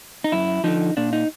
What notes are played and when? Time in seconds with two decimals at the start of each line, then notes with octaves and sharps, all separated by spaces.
0.24 D#4
0.32 F#2 E4
0.64 D3 F3 D#4
0.97 A#2 D4
1.13 D#4